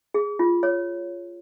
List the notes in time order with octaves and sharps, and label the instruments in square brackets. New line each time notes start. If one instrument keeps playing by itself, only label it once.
[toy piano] G#4
F4
C#5